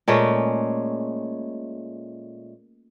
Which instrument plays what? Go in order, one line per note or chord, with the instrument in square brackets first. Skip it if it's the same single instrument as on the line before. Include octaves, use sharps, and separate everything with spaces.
[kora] A#2 G#3 A3 C#4